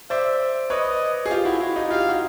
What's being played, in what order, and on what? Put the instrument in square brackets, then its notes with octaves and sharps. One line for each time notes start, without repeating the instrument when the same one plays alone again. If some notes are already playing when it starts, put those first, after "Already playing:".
[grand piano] C5 D5 [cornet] E5
[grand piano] B4 C#5 [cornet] D#5
[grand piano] G#4
F4 G4
E4 F#4
E4 F#4
D#4 F4
[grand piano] F4 G4 [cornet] F5
[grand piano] F#4